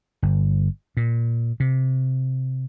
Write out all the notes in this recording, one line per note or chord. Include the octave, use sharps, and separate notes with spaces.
G1
A#2
C3